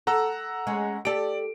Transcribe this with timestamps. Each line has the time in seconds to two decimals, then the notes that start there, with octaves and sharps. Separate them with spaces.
0.07 A4 F#5 A#5 E6
0.67 G#3 C#4
1.05 G4 A4 D5 D7